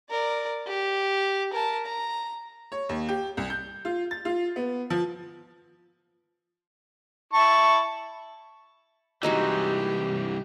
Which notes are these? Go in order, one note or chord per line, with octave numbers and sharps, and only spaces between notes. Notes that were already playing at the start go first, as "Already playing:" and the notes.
A#4 D5
G4
A#4 A5
A#5
C#5
D#2
G4
C2
G6
F4
A6
F4
B3
F3
E4 A5 C#6
C2 E3 G#3 D#4 F#4 G4